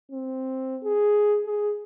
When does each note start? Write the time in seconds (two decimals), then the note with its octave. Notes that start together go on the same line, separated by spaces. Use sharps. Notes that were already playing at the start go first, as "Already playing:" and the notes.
0.12 C4
0.84 G#4
1.46 G#4